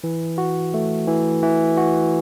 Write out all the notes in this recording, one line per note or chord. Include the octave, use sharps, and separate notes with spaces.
E3
F#4
A3
E3
E3
F#4